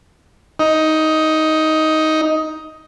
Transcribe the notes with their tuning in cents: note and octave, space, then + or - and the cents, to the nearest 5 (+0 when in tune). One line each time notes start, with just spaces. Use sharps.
D#4 +10